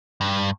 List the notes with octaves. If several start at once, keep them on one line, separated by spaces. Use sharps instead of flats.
G2